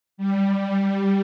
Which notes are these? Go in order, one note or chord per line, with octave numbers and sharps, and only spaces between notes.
G3